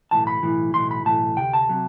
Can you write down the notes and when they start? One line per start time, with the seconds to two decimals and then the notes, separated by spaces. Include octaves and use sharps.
0.11 B1 A2 E3 A5
0.27 B5
0.43 B1 A2 E3
0.74 B1 A2 E3 C6
0.91 B5
1.05 B1 A2 E3 A5
1.37 D2 C3 G5
1.54 A5
1.69 C3 F#3